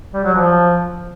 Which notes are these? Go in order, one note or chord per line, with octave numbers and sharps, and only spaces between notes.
G3
F#3
F3